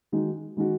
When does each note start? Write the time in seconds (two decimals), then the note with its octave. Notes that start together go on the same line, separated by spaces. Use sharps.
0.12 D#3 G#3 D#4 F#4
0.57 D#3 G#3 D#4 F#4